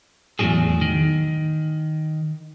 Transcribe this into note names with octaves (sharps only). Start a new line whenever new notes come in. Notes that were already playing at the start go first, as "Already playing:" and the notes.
E2 A2 C3 F3 F#3 G#4
D#3